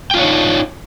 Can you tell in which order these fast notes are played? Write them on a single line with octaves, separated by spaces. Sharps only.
G5 F4 D4 C#5 D#4